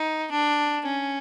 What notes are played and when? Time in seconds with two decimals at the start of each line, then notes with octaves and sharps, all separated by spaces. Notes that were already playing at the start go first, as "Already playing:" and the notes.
Already playing: D#4
0.32 D4
0.85 C#4